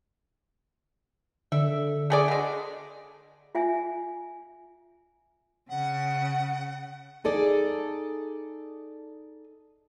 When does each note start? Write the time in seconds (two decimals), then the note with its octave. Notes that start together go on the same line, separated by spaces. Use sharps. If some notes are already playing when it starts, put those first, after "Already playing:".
1.52 D3 E5
2.10 A3 G#4 D5
2.28 B2 G#3
3.55 F4 E5 G#5
5.69 C#3 F#5
7.24 D#4 G#4 A4 D5